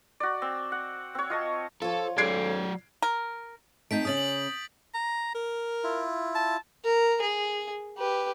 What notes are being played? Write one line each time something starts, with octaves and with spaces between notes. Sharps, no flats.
F#4 D5
C4
F#5
C4 C#5
F4 D#5 A5
F3 F4 A4 C#5
G#2 F#3 C#4 A4 D5 G#6 C7 D7
A#4
A3 C4 D#4 G6 B6 D7
C#3 C#4 D#6 A6 F#7
F#7
A#5
A#4
E4 F4
A5
A#4
G#4
G4 B4